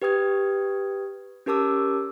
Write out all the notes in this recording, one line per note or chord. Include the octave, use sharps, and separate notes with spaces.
G4 B4 G5 D#6 G#6
C#4 G4 A#4 A5 D6 E6